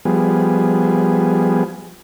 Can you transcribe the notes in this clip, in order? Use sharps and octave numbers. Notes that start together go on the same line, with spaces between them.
F3 G3 B3 G#4